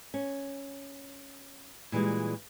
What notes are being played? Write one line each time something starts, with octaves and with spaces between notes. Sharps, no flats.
C#4
A#2 E3 G3 G#3